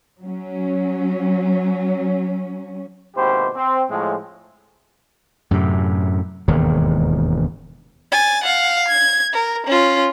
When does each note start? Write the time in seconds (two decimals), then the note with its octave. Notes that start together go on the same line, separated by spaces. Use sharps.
0.22 F#3 C#4
3.17 G#1 D#2 B2 E4 G4 C5
3.56 C4
3.90 A2 F3 G#3
5.51 F#2 A2 C3
6.48 E1 D#2 G#2 D#3
8.11 G#5 A6
8.43 F5 F#5
8.87 G#6
9.33 A#4
9.66 C#4 F4